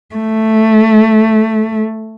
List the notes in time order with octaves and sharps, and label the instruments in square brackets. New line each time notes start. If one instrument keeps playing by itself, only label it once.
[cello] A3